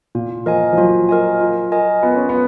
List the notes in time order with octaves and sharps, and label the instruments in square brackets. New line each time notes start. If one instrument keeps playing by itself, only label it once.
[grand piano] A#2 [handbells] F4
[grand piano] F3 [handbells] A#4 D#5 G#5
[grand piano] F3
[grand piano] F#3 [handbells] F4
[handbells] A#4 D#5 G#5
F4
A#4 D#5 G#5
[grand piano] B3 [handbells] F4
[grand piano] C#4
B3